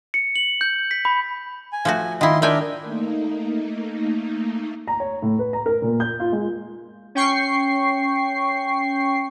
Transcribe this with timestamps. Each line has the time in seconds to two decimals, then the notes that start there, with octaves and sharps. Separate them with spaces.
0.14 C#7
0.36 F#7
0.61 G6
0.91 B6
1.05 B5
1.72 G#5
1.85 F3 A3 F#4
2.21 D#3 E4 F4 D#5 C6
2.42 G#3 D4 A#4 E5 G5 G#5
2.83 A3 A#3 D#4
4.88 A#5
5.00 C#5
5.22 A2
5.39 B4
5.53 A#5
5.66 A#4
5.82 A#2
6.00 G6
6.20 F4
6.32 G#3
7.15 C#4 G5 C#6 C7